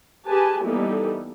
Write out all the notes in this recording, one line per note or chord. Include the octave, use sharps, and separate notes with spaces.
G4 G#4 B4 G#5 A5
E3 G3 A#3 B3 D#4 A4